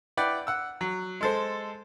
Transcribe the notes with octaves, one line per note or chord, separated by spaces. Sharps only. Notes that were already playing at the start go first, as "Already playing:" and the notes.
E4 B4 D5 F#5 G5
F#5 E6
F#3
G#3 A4 C5